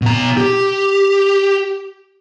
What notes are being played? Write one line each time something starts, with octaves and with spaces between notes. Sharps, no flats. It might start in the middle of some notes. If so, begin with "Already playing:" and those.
B2 A#5
G4